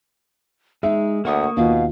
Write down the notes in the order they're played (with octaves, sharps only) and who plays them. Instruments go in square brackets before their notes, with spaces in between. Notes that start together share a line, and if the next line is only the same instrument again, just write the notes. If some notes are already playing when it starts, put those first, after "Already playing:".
[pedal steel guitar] G#3 [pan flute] D#4 [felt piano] E5
[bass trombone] D2 [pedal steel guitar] A#3 C#6 D#6 [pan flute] F#5
[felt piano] D#2 F4 [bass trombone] B2 [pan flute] F5